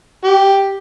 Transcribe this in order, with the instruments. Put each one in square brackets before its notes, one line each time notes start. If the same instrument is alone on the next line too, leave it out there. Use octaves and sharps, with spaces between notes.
[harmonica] G4